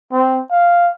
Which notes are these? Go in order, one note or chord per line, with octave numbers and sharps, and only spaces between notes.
C4
F5